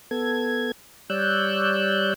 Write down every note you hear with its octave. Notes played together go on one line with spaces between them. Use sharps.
B3 A4 G#6
G3 C#5 D5 E6 F#6 G6